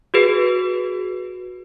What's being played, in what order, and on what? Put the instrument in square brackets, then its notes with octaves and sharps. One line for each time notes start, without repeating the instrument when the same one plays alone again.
[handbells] F#4 G#4 B4